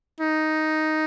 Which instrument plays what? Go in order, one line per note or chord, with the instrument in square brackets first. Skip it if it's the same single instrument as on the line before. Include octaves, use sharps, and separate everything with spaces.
[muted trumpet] D#4